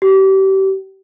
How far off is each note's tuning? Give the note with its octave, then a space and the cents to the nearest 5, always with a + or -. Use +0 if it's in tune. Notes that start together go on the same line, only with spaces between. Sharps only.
G4 -30